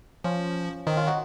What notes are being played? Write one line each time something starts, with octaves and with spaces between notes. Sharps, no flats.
F3 C#4 F4
D#3 C4 D#4
C#4 F4
D#4 F#4